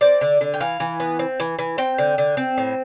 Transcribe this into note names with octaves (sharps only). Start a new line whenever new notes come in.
C4 D5
D3
D3
G5
E3 F5
E3
B3
C4
E3
E3
C4 G5
D3
D3
C4
A2